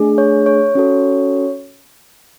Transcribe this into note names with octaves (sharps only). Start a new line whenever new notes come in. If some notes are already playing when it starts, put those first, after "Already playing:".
Already playing: A3 D4 G#4
C#5
C#5
C#4 F#4 A4